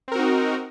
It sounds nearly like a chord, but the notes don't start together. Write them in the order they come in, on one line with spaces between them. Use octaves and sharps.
C4 A#4 F#4 D#4